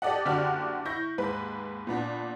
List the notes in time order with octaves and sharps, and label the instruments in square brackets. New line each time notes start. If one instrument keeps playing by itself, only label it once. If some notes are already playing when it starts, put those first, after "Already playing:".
[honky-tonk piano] G4 A4 D5 D#5 F#5
F#1 D3 F#4 G4 D5 F6
E4 C#6 G6 A#6
D#2 G#2 B4
A#2 B3 D4